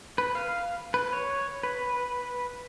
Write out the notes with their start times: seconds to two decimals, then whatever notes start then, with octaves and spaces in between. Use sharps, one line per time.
0.18 B4
0.35 F5
0.94 B4
1.13 C#5
1.63 B4